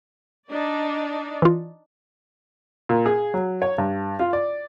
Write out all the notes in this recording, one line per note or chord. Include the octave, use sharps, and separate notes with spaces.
D4 D#4 D5
E3 F4
A#2
G#4
F#3
C#5
G2
F4
D5